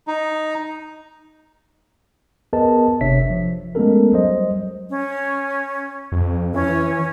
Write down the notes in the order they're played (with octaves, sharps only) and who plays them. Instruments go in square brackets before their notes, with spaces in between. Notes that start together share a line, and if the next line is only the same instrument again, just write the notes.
[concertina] D#4
[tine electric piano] B3 G#4 A#4 B4 D#5 A5
G1 C3 D4 C#5 E5 B6
F3
G#3 A3 B3 C#4 A4 A#4
F#3 G3 C5 D#5
[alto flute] C#4
[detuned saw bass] F2
[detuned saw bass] E3 [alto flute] C#4